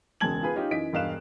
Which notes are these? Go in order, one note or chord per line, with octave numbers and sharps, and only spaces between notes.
E1 C#2 G#3 A5 G#6 F#7
F4 G#4 B4
C#4 D#4 F4 G4
F#2 E3 D#5 B6 D7
E1 G2 D#5 F5 F#6 E7